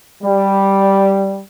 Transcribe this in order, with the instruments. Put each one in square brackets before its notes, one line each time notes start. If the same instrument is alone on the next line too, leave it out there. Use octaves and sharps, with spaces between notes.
[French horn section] G3